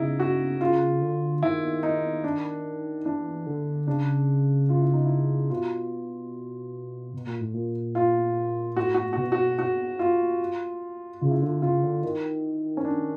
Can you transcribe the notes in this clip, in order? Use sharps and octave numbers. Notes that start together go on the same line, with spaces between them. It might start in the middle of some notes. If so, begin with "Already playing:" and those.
Already playing: C#3 D#4 E4
F#4
C#3 F4
D3
D#3 E4
D#4
D4
E3 D4
D3
C#3 D4
F4
E4
D#4
E4
B2 F4
B2
A#2
A2
A#2
F4
A2 F#4
F#4
B2 F#4
F#4
F#4
F4
C#3 F4
E4
D3 F4
C#3 F4
D3
D#3 E4
C#4
D4